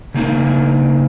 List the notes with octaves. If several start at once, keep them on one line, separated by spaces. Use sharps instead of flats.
C#3 A#3 D#4 A#4